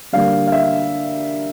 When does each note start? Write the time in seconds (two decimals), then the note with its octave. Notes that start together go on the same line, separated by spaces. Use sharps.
0.12 D3 G3 A#3 F5
0.47 F5
0.52 E5